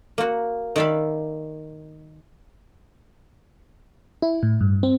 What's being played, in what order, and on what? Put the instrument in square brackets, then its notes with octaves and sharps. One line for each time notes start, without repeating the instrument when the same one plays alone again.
[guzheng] A#3 F#4
D#3 D5 E5 F5 B5
[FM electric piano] E4
A2
G2
C4